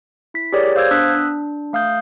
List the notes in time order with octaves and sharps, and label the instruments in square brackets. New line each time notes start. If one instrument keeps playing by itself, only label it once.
[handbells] E4 B6
G4 G#4 A#4 C#5 D5
C5 F5 E6 G6 G#6
B3 D4 D#6 E6 F#6 B6
D4
A3 F5 D#6 G6